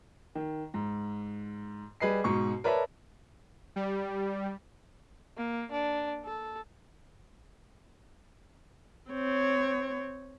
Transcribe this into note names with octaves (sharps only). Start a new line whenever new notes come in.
D#3
G#2
G3 G#4 B4 D#5 C7
G#2 B2 C#6
A#4 B4 C#5 D5 E5 A5
G3
A#3
D4
A4
C4 C#5